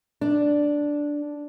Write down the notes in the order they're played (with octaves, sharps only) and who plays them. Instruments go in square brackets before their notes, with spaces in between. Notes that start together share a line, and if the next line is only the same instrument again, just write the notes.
[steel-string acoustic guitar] D4